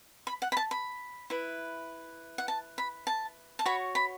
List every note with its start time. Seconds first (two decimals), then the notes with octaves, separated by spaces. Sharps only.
0.27 B5
0.42 F#5
0.52 B5
0.57 A5
0.71 B5
1.30 E4 B4
2.38 F#5
2.48 A5
2.78 B5
3.07 A5
3.59 A5
3.66 F#4 C#5 B5
3.95 B5